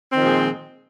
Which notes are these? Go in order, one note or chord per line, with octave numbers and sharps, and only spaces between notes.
A#2 D#3 F3 G#3 C4